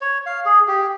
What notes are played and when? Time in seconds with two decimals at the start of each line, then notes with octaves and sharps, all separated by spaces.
0.01 C#5
0.26 F5
0.46 G#4
0.68 G4